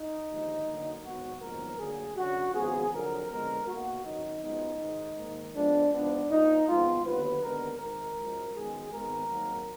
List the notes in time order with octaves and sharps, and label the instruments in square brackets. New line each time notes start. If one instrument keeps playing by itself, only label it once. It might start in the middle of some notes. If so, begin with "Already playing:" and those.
Already playing: [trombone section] D#4
D#2 D3 F3 G#3
D2 D3 F#3 A#3
G#1 G#2 F#3 B3 F#4
A#1 G#2 D#3 F#3 B3 A#4
D2 D3 F#3 A#3 G#4
F#2 D3 F#3 F#4
G#1 F#2 F3 B3 G#4
F2 D3 F#3 A#4
F2 D3 G#3 B3 A#4
B1 B2 A#3 F#4
G#1 F#2 D#3 F#3 D#4
F#2 F3 G#3 B3 D#4
G#2 D#3 G#3
G#2 D#3 A#3
F2 F3 G#3 B3 D4
G#2 F3 B3 D4
A#1 A#2 F3 D#4
G#1 G#2 F3 G#3 B3 F4
D#2 D3 F#3 B3 B4
D#2 D3 G#3 B3 A#4
G#1 G#2 D#3 A#4
F#2 F3 G#3
F#2 D#3 G#3 B3 G#4
G#1 G#2 D#3 G#3 B3 A#4
G#1 G#2 F#3 A#3